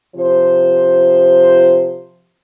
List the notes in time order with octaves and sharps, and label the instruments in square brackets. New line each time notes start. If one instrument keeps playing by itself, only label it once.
[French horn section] C3 F3 C5